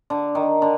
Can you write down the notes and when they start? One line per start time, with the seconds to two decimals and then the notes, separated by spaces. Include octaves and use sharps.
0.10 D3
0.35 D#3
0.62 D3